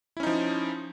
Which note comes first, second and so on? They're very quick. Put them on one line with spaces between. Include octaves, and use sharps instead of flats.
E4 C#4 D#4 F3